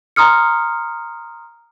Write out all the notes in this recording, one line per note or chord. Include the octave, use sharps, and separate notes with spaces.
A#5 C6 D#6 F6 C#7